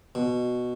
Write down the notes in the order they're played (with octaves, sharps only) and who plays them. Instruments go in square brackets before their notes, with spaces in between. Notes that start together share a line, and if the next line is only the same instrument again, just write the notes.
[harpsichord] B2